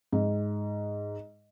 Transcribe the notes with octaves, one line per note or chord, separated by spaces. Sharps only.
G#2